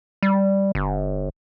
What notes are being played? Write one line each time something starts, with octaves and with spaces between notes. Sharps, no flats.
G3
G1